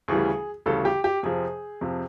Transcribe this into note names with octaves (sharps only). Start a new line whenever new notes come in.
D2 C#3 E3 G3 G#4
D2 C#3 E3 G3 A4
G4
G4
F2 C3 F3 G#4
F2 C3 F3